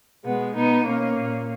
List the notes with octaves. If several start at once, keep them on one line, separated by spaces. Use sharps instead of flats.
B2 G#3 B3
B2 B3 D#4
B2 A#3 C#4
A#2